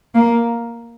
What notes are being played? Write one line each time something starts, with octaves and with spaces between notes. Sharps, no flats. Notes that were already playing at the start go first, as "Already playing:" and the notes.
A#3